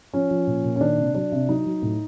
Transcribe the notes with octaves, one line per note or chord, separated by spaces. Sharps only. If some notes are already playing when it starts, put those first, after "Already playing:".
F3 C#4
F3
A#2
A#2
C#4
D#3 D4
C3
F#3 D4
C3
F#3 D#4
F#3
A2